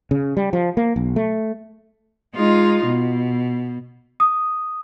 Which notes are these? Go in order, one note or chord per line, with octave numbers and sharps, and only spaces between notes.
C#3
G3
F3
A#3
B1
A3
G#3 D#4 F4
B2
D#6